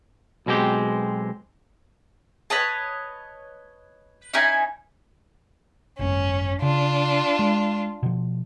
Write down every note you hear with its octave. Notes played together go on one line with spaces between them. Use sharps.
B1 B2 G#3 C4 G4
B4 C#5 D#5 A5
C#4 D#4 E4 G#5
G#1 F#2 C#4
C#3 D4 F4
G#3
B2 F3